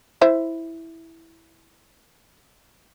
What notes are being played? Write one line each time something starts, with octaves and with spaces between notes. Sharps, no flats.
E4 C5 E5